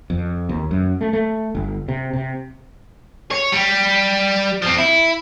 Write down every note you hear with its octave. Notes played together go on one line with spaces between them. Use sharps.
F2
D#2
F#2
A3
A3
G1
C3
C3
C#5
G3
F3 C4
E4